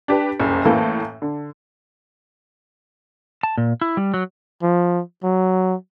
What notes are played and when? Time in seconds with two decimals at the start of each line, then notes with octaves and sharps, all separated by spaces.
0.08 D4 G4 B4
0.40 F#1 C2 F2
0.65 A2 E3 A#3 A4
1.22 D3
3.43 A5
3.58 A#2
3.81 E4
3.97 G3
4.14 F#3
4.63 F3
5.23 F#3